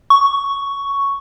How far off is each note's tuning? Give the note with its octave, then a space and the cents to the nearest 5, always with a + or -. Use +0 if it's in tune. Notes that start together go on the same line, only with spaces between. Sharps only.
C#6 +5